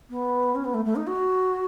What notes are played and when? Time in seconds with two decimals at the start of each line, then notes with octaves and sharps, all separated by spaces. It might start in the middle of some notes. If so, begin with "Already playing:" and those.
0.09 B3
0.55 C#4
0.64 B3
0.74 A3
0.85 A3
0.95 D#4
1.06 F#4